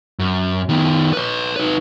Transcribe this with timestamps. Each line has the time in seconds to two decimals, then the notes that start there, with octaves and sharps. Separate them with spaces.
0.19 F#2
0.69 D#3 B3
1.13 B4 C#5
1.56 D#4 B4